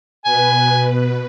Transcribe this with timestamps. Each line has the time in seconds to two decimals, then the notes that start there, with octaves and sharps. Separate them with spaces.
0.25 B2 B4 G#5